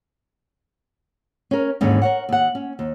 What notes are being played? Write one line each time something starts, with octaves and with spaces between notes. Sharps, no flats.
C#4 A#4
D#2 G#2 D3 E3 C#4
A#4 C#5 F#5
D#2 F#5
C#4
D#2